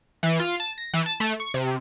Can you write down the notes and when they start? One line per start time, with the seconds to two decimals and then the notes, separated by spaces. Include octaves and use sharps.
0.23 E3
0.40 F4
0.60 A5
0.78 A#6
0.94 E3
1.06 A5
1.20 A3
1.40 C#6
1.54 C3